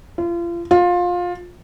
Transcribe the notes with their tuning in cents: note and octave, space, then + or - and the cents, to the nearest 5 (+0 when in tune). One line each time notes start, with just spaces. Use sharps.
F4 -35
F4 +20